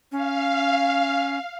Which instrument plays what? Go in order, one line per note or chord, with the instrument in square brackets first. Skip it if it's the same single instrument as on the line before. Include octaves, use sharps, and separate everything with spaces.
[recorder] C#4 [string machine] F5